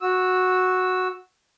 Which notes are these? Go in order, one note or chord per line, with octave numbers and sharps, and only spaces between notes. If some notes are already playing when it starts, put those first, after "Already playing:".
F#4 E6